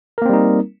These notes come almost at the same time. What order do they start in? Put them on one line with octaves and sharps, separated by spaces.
A#4 A#3 C4 G3 D#4